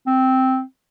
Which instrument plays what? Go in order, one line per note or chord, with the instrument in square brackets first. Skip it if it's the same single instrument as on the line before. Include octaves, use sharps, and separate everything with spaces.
[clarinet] C4